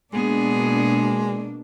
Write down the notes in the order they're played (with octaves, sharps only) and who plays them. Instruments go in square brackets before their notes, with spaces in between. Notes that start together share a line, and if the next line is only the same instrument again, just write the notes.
[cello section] B2 A#3 D4 [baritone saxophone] G#3 [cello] B3 G#4